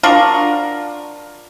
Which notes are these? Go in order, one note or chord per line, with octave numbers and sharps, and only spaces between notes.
D4 F4 F#4 A#4